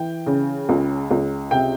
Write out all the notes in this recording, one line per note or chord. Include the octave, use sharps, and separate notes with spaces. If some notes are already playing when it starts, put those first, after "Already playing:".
Already playing: E3 G5
C#3
C#2
C#2
C3 G5